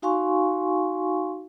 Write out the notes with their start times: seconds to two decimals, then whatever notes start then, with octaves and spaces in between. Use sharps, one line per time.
0.02 D#4 F#4 F5 G#5 C6 C#6